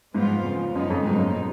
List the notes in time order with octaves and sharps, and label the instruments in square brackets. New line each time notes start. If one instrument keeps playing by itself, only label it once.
[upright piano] G#2 [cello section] F3 G#3 B3 F4
[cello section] F2 C#3 F3
[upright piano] F#2 [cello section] C#3 F3 G#3 B3 D#4
[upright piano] F2
[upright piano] G#2 [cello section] B2 F#3 A#3 D#4
[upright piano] F#2